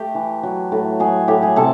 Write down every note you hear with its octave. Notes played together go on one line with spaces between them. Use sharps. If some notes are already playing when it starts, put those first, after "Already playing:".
Already playing: A3 G4 G5
E3
F#3
A2
F#3 G#4 G#5
A2 G4 G5
G#4 G#5
C3 A4 A5